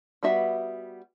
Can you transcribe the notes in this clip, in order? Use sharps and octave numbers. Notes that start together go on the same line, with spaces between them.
G3 B3 F#4 E5